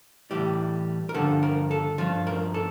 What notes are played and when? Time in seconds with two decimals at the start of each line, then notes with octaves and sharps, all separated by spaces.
0.31 A2 E3 G3 G4
1.09 A#4
1.14 G2 D3 F3 A4
1.43 A#4
1.71 A4
1.98 G2 F3 F4
2.27 A#4
2.54 A4